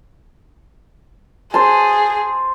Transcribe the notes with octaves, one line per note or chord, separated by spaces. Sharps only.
G#4 C5 A5